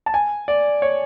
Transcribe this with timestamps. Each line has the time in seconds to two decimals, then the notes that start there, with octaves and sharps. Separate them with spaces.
0.06 A5
0.14 G#5
0.48 D5
0.82 C#5